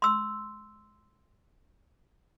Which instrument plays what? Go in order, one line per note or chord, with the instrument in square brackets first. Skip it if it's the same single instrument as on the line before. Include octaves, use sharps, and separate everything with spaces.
[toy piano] C6 E6